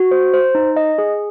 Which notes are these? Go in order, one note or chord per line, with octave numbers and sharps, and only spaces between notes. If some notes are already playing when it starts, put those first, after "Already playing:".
Already playing: F#4
C5
C5
D#4
D#5
G#4